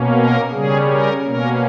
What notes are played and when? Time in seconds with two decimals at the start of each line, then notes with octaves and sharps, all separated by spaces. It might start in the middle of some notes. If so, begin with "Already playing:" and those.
Already playing: B2 A#3 C#4
0.16 A#4
0.52 C#3 G3 C#4 G#4
0.88 A#4
1.24 B2 A#3 C#4 A#4